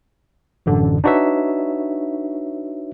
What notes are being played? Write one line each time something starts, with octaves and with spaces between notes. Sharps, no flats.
A1 F#2 D3
D4 D#4 F#4 B4 C#5 E5